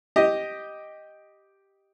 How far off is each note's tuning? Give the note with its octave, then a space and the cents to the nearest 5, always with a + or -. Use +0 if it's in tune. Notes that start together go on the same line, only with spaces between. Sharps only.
G4 +0 D#5 +0